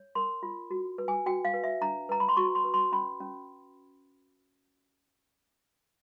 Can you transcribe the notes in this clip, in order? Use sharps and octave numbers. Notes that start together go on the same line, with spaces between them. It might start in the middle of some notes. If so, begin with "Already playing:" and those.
Already playing: C#5
A#4 C6
F4
F#4
B4
G#5
F#4 G5
F5
B4
E5
D4 A#5
B4 A#5
B5
C6
F#4 C#6
C6
B4
C6
C#4 B5
C#4